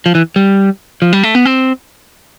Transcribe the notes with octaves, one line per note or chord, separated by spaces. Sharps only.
F3
E3
G3
F3
G3
A3
B3
C4